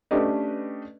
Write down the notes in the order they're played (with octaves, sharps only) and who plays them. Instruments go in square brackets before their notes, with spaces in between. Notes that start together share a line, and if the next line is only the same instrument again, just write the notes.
[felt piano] A3 C#4 D4 G4 B4 D#5